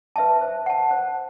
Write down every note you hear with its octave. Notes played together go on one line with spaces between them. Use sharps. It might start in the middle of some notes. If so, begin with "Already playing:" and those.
B4 E5 A5
C5
F#5 A5
C5